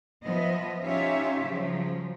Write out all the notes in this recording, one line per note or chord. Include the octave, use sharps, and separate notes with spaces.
F3 B3 D#5 E5
C#4 D#4 F4 G4 C#5 E5
C#3 F3 F#3